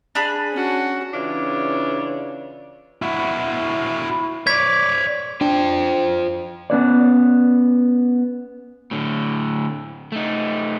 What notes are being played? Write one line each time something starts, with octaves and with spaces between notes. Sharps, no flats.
D4 G#4 B5
C#4 F#4
C#3 E3 D4 F4 C#5
E4 F#4
C#5 D5 G#6 B6
D4 F4 C5 G5
B3 C#4 B4 D5
A2 D3
A3 D#4